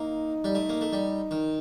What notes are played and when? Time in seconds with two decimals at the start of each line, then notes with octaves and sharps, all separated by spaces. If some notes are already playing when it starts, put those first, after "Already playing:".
Already playing: A#3 D#4
0.44 G3
0.55 A3
0.69 A#3
0.81 A3
0.93 G3
1.31 D#3